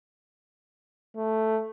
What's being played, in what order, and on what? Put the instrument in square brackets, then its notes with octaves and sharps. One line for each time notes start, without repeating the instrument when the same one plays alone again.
[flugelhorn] A3